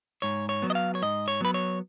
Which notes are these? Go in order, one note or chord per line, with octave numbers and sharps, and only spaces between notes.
G#2 C#5
C#5
F#3 B3
D#5
F5
C#5
G#2 D#5
C#5
F#3 B3 B4
C#5